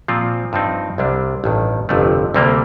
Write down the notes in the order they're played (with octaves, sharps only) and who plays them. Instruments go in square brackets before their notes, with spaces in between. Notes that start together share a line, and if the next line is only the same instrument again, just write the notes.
[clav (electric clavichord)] A#2 F3 C4 F4
G2 F3 C4 D#4
C2 C3 G3 D4
A1 G2 D#3
G1 F2 C3 F3 A3
D2 C3 G3 A#3